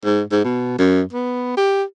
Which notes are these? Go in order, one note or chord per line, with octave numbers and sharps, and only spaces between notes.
G#2
G#2
B2
F#2
B3
G4